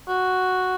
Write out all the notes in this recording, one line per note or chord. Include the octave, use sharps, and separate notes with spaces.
F#4